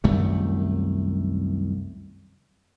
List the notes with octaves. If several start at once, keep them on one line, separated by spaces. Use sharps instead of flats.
C2 F#2 D#3 A3